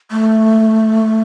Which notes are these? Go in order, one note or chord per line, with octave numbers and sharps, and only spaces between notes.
A3